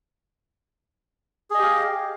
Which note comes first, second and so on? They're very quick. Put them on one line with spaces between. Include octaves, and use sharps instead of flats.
G#4 D#5 G4 F5